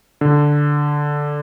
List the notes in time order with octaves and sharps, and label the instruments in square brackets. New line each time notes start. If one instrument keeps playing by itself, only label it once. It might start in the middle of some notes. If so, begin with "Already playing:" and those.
[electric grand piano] D3